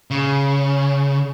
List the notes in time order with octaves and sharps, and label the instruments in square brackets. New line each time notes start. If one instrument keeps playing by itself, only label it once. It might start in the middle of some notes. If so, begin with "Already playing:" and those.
[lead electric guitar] C#3